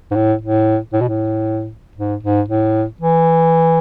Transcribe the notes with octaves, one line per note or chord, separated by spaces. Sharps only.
G#2
A2
A2
A2
B2
A2
G#2
G#2
A2
E3